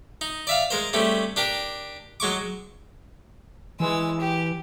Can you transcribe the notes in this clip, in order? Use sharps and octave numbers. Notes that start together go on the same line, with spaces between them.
D#4
D5 E5 F5
G#3 A#4 C5
G3 A3 C4 C#4
D4 G4 A#4
F#3 G#3 C#6 D6
E3 G#3 E6
G4